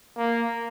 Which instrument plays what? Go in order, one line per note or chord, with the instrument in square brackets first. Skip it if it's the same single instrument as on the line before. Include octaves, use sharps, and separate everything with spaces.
[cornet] A#3